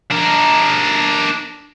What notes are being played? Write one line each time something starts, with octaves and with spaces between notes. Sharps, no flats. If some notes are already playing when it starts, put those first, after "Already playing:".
D4 A#4